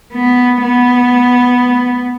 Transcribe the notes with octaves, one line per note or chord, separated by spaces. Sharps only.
B3
B3